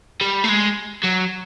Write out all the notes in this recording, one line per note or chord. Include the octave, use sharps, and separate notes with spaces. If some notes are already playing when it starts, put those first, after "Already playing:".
G3
A3
G#3
F#3